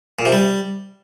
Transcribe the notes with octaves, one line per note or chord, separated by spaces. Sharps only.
A#2
C3
G3